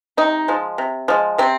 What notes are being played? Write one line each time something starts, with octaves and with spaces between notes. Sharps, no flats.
C3 D#4
F3 G#3
C3
F3 G#3
C3 C4